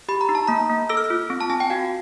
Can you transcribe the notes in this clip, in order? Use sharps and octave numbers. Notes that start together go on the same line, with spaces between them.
G4 B5
A#5
D#4
A5
A#3 A#5
A#3
A4 E6
F6
E6
F4
C4
A5
C4 G#5
G5
F#4 F5